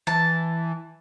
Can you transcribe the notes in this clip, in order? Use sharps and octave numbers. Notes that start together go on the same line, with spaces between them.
E3 A5